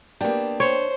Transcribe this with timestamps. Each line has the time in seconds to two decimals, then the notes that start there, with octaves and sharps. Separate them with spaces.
0.21 A#3 B3 D4 G4
0.60 C5 C#5